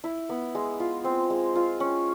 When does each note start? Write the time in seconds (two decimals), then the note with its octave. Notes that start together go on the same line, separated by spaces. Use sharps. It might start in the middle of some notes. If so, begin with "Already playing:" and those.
0.04 E4
0.30 B3
0.55 G#3
0.80 F4
1.04 C4
1.30 G#3
1.55 F4
1.80 C#4